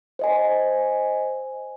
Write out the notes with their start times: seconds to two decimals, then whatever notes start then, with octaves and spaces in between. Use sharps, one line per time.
0.19 C5 D#5 G#5